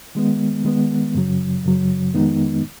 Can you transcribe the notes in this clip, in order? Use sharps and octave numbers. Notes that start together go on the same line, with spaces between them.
D#3 G#3 B3
D#3 G#3 B3
F#2 C#3 F#3
F#2 C#3 F#3
F2 D#3 G#3 B3 D#4